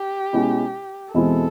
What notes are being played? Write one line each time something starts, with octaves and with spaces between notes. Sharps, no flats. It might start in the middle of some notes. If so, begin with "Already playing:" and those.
Already playing: G4
B2 G#3 C#4 E4
E2 B2 G#3 C4 E4 A4